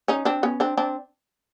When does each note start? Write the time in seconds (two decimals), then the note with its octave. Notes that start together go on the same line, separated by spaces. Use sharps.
0.08 C#4 D#4
0.25 C4 D4
0.43 B3 C#4
0.60 C4 D4
0.77 C4 D4